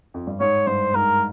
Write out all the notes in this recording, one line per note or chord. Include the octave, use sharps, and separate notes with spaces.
F2
G2
G#2 C#5
G2 C5
G#2 A#4